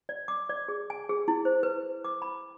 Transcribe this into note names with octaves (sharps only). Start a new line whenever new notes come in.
D5
D6
D5
G#4
G#5
G#4
E4
C5
B4
D6
B5